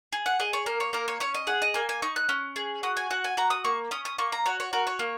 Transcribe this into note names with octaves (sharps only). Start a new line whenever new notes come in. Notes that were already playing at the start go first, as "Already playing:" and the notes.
G#4
F#5
G#4 D#5
C#5
A#3 A#4
C#5
A#3 A#4
C#5
C#4 C#5
D#5
G#4 F#5
D#5
A#3 G#5
G#5
D#4 C#6
F#6
C#4
G#4
F#4 D#6
G#5
F#4 F#5
G#5
F#4 A#5
D#6
A#3 C#6
C#4 D#6
D#6
A#3 C#6
A#5
F#4 C#5
C#5
F#4 A#4
C#5
A#3